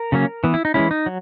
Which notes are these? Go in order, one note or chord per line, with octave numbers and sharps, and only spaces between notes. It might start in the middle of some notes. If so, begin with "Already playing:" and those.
Already playing: A#4
C#3 F#3 A#3 C#4
E3 B3
E4
D#4
E3 G#3 C#4 E4
D#4
F#3